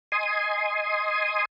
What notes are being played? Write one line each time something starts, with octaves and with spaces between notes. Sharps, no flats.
D#5 G#5 C6 D#6